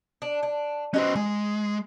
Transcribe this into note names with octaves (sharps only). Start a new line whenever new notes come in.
D4
D4
B3 C#4 F#4 C5 D#5
G#3 G#5